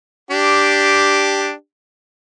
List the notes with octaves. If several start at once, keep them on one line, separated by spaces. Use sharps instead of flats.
D4 G4